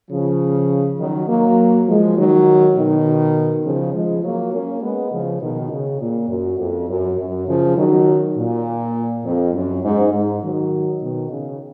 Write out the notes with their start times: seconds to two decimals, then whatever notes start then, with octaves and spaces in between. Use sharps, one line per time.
0.10 C#3 F3
0.98 D#3 F#3
1.28 F#3 A#3
1.87 F3 G#3
2.17 D#3 F#3
2.76 B2 D#3
3.64 C#3 F3
3.93 F3 G#3
4.23 F#3 A#3
4.52 A#3 C#4
4.82 G#3 B3
5.11 C#3 F3
5.41 B2 D#3
5.71 C#3
6.00 A#2
6.29 F#2
6.59 F2
6.89 F#2
7.17 F#2
7.47 C#3 F3
7.76 D#3 F#3
8.36 A#2
9.24 F2
9.54 F#2
9.84 G#2
10.12 G#2
10.42 D#3 F#3
11.01 B2 D#3
11.31 C#3